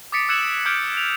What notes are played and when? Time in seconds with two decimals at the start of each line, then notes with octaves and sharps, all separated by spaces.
0.12 D6 D#6 A6 B6 C#7 D7
0.29 E6 F#6 G#6 C#7 E7 F#7
0.66 D6 F6 G6 G#6 D7
0.97 F7